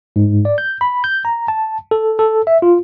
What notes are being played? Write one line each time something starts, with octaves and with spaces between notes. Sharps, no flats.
G#2
D5
G6
B5
G6
A#5
A5
A4
A4
E5
F4